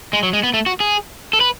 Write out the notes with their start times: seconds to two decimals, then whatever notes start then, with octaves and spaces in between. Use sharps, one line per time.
0.13 G#3
0.23 F#3
0.33 G#3
0.43 B3
0.54 A3
0.66 F#4
0.80 G#4
1.33 A4
1.41 B4